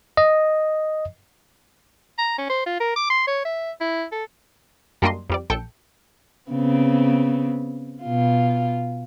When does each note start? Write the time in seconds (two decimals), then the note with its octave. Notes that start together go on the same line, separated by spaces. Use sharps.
0.17 D#5
2.18 A#5
2.38 C#4
2.50 C5
2.66 F4
2.80 A#4
2.96 D6
3.10 C6
3.28 C#5
3.45 E5
3.81 E4
4.12 A4
5.02 F#2 G3 A#3 D4 D#5 C6
5.30 F2 G3 D5
5.50 A#1 A4 G5 A5 C#7
6.51 C#3 B3 C4
8.03 B2 F4